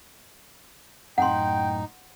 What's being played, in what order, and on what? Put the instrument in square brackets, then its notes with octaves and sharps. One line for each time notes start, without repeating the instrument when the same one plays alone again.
[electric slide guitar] F#2 A2 [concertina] D#4 [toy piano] F#5 C6 [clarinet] G5